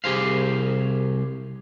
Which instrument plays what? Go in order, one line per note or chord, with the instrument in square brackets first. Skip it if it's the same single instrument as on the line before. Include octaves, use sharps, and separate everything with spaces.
[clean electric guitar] C2 G4 G#4 C5 F5